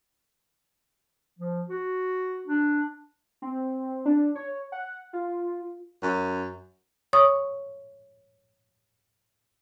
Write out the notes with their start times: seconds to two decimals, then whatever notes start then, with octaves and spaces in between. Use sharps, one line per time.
1.39 F3
1.69 F#4
2.47 D4
3.42 C4
4.05 D4
4.35 C#5
4.72 F#5
5.13 F4
6.03 F#2
7.13 C#5 C#6 D#6